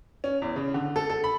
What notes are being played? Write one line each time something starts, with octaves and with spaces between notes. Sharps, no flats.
C#4
E2
C#3
D3
A4
A4
B5